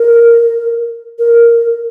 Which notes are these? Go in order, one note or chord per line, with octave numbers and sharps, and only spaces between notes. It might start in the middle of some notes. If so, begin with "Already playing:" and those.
Already playing: A#4
A#4